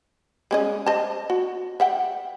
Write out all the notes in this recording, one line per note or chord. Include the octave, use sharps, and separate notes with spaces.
G#3 C#4 D#5
C5 D#5 A5
F#4
E5 F#5 G5